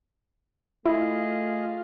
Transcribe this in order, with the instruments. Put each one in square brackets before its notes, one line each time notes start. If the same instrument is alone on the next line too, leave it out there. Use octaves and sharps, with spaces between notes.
[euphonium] A3 [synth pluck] E4 [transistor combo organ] F4 [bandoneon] G#4 D#5